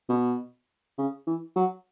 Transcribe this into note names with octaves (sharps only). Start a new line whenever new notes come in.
B2
C#3
E3
F#3